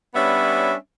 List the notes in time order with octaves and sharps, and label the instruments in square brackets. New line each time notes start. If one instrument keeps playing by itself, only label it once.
[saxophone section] G3 B3 C#4 D4 C#5 E5